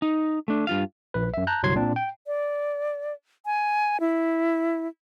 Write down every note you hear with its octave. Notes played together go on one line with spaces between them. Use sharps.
D#4
A3 D4
G2 F4 F5
A#1 B4
F#2 E5
A5 A#5 F#6 G6
G1 C2 F#3 C6 G#6 C7
A#2 C4 D4
G5
D5
G#5
E4